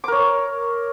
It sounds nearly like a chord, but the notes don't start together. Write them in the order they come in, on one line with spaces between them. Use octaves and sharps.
D6 A#4 C#5